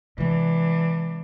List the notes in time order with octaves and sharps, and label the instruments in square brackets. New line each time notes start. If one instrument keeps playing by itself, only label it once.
[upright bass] C3 G#3 [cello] E3 D4